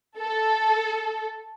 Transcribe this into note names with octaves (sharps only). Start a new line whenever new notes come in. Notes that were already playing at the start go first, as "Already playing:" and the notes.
A4